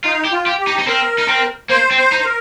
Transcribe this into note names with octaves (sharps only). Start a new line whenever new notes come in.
D#4 F4
G4
F4
G4
G4
D#4
D#4
C4 A#4
D#4
C4
A#3 C5
C4
C5
D#4
C5
A#4